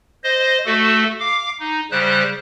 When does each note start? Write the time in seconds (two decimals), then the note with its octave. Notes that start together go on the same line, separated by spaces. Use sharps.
0.24 C5 D#5
0.66 A3 F#4 A4
1.20 F5 D6
1.60 D#4
1.91 C#3 G3 C5 F#6